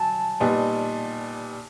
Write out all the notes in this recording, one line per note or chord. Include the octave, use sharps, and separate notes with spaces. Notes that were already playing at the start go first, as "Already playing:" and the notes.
Already playing: F#3 G#5 A5
A#2 G3 B3 D#4